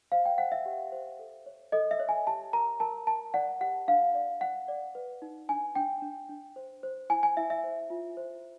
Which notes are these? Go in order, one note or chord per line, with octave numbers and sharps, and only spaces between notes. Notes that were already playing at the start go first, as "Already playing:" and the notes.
C5 F5
G5
C5 F#5
E5
G4
C5
A4
C#5
A4 D#5
E5
C#5
G#5
G4 A5
A#4 A#5
A#4 A5
A#4 A5
D5 F#5
G4 F#5
D4 F5
D5
D5 F#5
D5
B4
D#4
D4 G#5
D4 G5
D4
D4
C5
C5
E4 G#5
G#5
E4 E5
E5
C5
F4
C5